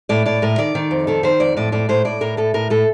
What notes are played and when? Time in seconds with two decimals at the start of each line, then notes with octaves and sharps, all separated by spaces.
0.09 A2 D5
0.26 A2 D5
0.42 A2 A#4
0.58 D#3 D5
0.75 D#3
0.91 F2
1.07 D#3 A4
1.23 D#3 C5
1.40 F2 D5
1.57 A2 D5
1.72 A2 D5
1.89 A2 C5
2.05 A2 D5
2.21 A2 A#4
2.37 A2 A4
2.54 A2 A#4
2.70 A2 A4